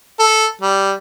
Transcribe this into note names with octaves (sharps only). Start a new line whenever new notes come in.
A4
G3